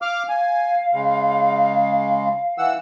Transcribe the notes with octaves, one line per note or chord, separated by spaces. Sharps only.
F5 D6 F6
F5 G#5
C#3 G#3
E3 F#5 E6